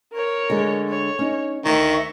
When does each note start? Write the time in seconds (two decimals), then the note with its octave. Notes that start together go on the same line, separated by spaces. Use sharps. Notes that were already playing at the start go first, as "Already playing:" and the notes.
0.13 A#4 C#5
0.50 D3 G#3
0.89 C#5
1.19 C#4 D#4
1.65 D2 D#3 E5 C#6